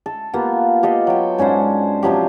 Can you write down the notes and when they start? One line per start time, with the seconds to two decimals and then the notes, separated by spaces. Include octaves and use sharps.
0.06 A4
0.33 A#3 B3 F4 G4
0.83 G4 A4 D#5 F5
1.07 F#3 G5
1.38 G#2 C#4 D4 C5
2.03 C3 F3 F#3 G4